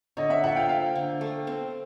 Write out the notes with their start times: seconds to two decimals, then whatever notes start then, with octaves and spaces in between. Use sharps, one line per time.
0.17 D3 C#5 D#5
0.30 E5 F#5
0.44 F3 E5 F#5
0.56 F5 G5
0.69 A#3 F5 G5
0.95 D3
1.21 A3
1.47 C4